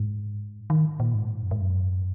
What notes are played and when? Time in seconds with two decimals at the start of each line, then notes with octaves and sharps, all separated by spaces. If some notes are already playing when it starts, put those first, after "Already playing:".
Already playing: G#2
0.70 D#3
1.00 A#2
1.14 G#2
1.42 F#2
1.51 G#2
1.61 F#2